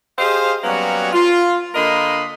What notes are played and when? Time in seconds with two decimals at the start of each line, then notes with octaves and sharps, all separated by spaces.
0.19 G4 G#4 C5 D#5 F5
0.64 F#3 G3 A#3 B3 C#4 F#4
1.13 F4
1.75 D3 A#3 A#4 D#5 B5 C6